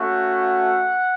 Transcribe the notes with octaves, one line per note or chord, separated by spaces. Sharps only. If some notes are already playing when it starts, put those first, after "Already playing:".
Already playing: A3 C#4 F#4
F#5